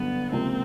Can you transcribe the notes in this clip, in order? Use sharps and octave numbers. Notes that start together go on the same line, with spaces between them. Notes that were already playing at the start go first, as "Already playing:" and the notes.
Already playing: G2 D3 F#3 B3
C#2 C3 F3 A#3 C4